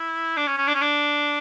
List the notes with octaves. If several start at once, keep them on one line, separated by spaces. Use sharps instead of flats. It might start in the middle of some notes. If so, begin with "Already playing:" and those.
Already playing: E4
D4
C#4
C#4
D4
C#4
D4